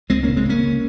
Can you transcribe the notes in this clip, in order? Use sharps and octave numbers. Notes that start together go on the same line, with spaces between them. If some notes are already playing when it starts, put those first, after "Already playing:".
C#2 G#3 C4
C#3 A#3 C#4
G#3 C4
C#3 A#3 C#4
C#3